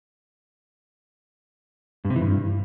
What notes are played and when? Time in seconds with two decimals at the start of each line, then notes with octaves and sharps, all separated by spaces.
2.05 G2
2.10 C3
2.16 E3
2.22 G2